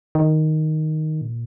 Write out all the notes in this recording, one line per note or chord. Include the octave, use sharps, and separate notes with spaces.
D#3
A#2